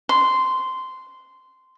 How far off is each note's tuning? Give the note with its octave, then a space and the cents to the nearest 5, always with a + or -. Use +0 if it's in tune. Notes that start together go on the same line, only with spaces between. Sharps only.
C6 -10